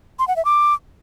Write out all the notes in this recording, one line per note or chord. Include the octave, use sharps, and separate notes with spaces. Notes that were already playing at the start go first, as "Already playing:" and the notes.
C6
F#5
E5
D6